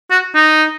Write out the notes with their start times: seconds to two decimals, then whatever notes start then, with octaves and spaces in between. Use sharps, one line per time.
0.11 F#4
0.35 D#4